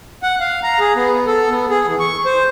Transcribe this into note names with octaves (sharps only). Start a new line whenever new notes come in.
F#5
F5
A#5
G#4
B3
A4
B3
G#4
E3
C#6
C5